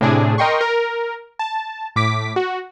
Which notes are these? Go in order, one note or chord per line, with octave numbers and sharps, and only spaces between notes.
A2 C3 D4 G#4
A#4 D#5 G5 C6 C#6
A#4
A5
A2 D6 B6
F#4